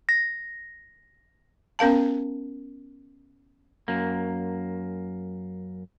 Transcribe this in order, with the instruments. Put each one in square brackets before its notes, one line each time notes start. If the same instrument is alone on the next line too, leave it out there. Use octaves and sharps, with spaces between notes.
[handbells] A#6
[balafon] B3 C#4 A#4 F5 A5
[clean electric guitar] F#2 A#3